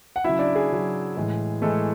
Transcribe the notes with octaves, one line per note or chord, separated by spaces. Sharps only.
F#5
C#3 F#3 E4 E5
D4 D5
G#4
C#3 F#3
A2 E3 G#3
A2 E3 G#3 A3 A4